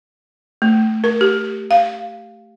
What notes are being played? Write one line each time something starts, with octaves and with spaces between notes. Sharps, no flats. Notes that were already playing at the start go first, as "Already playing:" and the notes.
A3
A#4
G4
F5